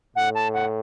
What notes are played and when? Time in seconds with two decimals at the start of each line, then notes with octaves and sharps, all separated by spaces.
0.16 A2 F#5
0.35 A5
0.54 F#5